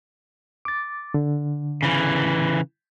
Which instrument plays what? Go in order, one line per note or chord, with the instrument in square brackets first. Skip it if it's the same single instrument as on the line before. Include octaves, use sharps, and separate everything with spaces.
[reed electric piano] D6 A6
D3
[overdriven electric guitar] C#3 E3